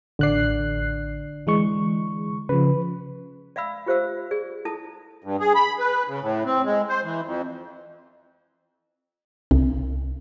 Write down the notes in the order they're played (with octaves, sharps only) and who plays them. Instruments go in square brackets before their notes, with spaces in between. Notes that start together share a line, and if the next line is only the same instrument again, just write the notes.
[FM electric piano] A1 F#6 C7 [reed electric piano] D3 D5
[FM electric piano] E3 G#3 C#6
[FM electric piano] C#3 F3 [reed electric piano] B4
[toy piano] D5 E5 F5 B5 E6
F4 G4 C5 E5 F5 E6
G#4 D5
E4 A4 A5 D#6
[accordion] G2
G#4
B5
B4
C#3
A2
C4
G#3
C5
E3
F2
[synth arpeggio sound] C2